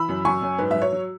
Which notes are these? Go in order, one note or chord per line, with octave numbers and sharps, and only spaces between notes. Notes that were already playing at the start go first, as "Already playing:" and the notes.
Already playing: E3 B5 E6
F#2
F#2 G#5 C#6
F#2
G#2 B4
F#3 E5
C#5
F#3